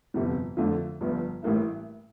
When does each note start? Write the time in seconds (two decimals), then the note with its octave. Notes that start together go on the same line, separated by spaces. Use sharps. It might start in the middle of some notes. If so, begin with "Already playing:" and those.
0.14 G1 F2 C3 G3
0.57 F2 D3 A3 D4 F4
1.01 G1 G2 F3
1.43 A1 A2 G3 A#3 E4